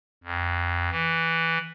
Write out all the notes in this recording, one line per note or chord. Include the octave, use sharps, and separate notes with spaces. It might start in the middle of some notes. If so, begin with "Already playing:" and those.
F2
E3